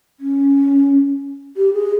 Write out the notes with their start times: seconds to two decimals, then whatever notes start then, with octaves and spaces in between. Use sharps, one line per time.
0.20 C#4
1.57 G4
1.74 G#4